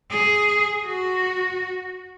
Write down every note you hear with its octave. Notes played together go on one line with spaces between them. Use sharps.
G#4
F#4